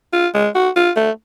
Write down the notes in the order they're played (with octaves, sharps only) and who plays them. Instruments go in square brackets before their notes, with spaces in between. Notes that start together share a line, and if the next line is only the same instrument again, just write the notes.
[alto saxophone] F4
G#3
F#4
F4
A3